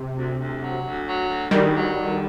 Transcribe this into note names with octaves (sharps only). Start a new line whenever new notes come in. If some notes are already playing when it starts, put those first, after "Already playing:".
Already playing: C3
D2
D2
F#3
D2
F#3
D2
D2 D#3 G3
F#3
D3